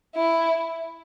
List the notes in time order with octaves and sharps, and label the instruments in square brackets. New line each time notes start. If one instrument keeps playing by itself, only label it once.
[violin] E4